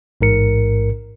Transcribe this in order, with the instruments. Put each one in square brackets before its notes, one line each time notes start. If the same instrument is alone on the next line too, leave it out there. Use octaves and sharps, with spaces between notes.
[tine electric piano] A1 G#2 A#4 C#7